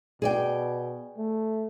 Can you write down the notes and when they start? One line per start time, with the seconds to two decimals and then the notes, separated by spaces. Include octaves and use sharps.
0.22 B2 G#4 D5 G5
1.17 A3